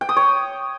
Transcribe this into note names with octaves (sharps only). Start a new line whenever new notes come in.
G5
D#6
C#5